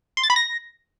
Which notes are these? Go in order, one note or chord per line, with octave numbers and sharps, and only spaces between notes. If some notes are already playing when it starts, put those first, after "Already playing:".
C6
A6
B5
A#6